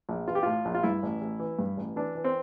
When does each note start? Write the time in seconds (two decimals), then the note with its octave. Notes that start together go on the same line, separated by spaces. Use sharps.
0.09 A#1
0.28 E3 F4
0.35 G4
0.43 A2 F4
0.65 A#1
0.75 F4
0.83 G2 E4
1.03 A1
1.21 A1
1.40 E3
1.59 G2
1.77 A1
1.96 E3 D4
2.15 E3
2.24 C4